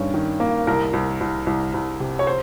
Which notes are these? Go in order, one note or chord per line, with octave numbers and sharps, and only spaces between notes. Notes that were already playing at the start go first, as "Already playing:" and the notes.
Already playing: G2 D#3 C#4
D#3
A#3
C2 A#4
C2
C2
C2
C2
C3
C#5
C5